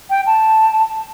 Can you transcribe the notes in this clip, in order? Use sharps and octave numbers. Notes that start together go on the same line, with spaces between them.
G5
A5